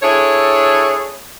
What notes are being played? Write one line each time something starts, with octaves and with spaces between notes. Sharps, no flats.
D4 E4 G#4 A4 C#5